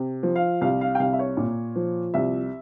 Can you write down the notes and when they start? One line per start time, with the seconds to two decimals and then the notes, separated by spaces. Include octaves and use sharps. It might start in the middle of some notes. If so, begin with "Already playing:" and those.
Already playing: C3
0.23 F3
0.36 F5
0.61 C2 F5
0.81 F5
0.95 G5
1.00 C2 F5
1.13 E5
1.19 C#5
1.37 A#2
1.76 F3
2.14 C2 E5